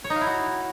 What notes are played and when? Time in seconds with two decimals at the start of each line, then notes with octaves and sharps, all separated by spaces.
0.04 C#5
0.10 D#4
0.16 F5
0.21 E4
0.27 F#4